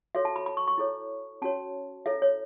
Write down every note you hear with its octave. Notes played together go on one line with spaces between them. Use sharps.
F#4 A4 C#5 E5
A5
B5
B5
C#6
C#6
E4 A4 C#5
C#4 F#4 C#5 A5
E4 A4 C#5 E5
C#5